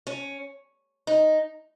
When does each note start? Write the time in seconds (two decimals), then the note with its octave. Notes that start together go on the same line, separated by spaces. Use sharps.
0.07 C#4
1.07 D#4